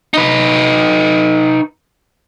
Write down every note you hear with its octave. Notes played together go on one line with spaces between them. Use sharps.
D#4 B4